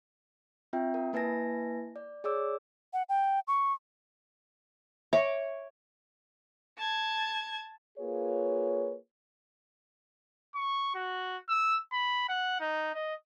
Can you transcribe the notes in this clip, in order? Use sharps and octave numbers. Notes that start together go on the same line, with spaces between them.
C4 F4 E5 G5
A#4
A#3 E4 B4 G#5 A5 A#6
D5
G#4 C#5 D5 D6 E6
F#5
G5
C#6
C#5 E5 D6
A5 G#6
A#3 F4 G#4 B4 C#5
C#6
F#4
E6
B5
F#5
D#4
D#5